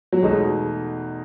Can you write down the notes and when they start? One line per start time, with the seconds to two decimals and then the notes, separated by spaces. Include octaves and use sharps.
0.12 F#3
0.22 E2 B2 G#3 A3 D#4